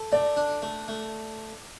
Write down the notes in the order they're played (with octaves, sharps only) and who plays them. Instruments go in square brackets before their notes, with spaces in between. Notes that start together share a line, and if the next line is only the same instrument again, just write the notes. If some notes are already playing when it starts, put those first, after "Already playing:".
Already playing: [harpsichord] A4
[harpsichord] A3 [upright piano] D5
[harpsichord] D4
A3
A3